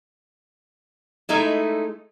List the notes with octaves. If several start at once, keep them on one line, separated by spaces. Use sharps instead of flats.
G#3 A3 D#4 E4